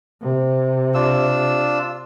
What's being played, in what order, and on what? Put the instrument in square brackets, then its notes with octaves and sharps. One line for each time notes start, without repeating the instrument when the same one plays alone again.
[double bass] C3
[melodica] D4 F4 E6